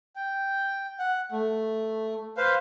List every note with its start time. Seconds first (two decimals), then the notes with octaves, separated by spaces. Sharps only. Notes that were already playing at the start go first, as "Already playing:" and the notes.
0.16 G5
0.99 F#5
1.32 A3
2.37 B4 C5 F5